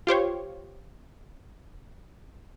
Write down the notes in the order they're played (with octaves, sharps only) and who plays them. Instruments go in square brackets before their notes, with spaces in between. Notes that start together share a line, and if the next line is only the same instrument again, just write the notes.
[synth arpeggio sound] F4 G4 C5 C#5